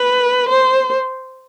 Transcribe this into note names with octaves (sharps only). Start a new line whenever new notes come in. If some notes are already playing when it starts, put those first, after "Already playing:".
Already playing: B4
C5